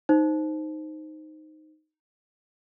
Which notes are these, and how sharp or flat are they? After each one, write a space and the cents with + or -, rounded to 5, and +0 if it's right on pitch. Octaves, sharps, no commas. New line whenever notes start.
D#4 +0 C5 +0